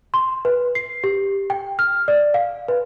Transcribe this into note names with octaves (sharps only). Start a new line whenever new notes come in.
C6
B4
C7
G4
G5
F6
D5
F5
B4